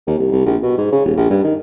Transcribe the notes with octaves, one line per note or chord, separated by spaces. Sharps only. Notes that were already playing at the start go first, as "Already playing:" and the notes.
D#2
C2
C2
A#1
B2
G#2
C#3
D#1
A#1
G2
D#3